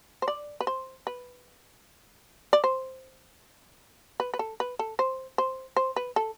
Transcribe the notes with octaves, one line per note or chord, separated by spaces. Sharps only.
C5
D5
B4
C5
B4
D5
C5
B4
B4
A4
B4
A4
C5
C5
C5
B4
A4